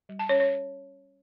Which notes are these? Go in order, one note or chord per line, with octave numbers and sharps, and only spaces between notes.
G3
A5
C#4 C#5
C#5